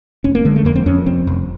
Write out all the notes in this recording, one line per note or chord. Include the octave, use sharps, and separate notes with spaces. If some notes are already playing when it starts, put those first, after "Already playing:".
F1 C#4
A#3
D3 G#3
A3
F2 A#3
C4
F2 C#4
F1 C4
F1